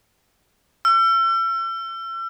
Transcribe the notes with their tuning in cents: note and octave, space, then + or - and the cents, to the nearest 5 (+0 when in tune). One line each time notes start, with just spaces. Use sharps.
E6 +40